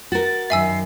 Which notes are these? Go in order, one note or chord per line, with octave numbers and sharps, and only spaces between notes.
F#4 A#4 A6
F#2 D#3 E5 G#5 E6 C7